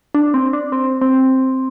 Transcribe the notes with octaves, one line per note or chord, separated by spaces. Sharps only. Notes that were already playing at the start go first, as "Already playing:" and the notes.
D4
C4
D4
C4
C4